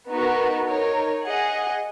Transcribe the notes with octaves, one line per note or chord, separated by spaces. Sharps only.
B3 D#4 F#4 A#4
D#4 A#4 C#5
G#4 D#5 F#5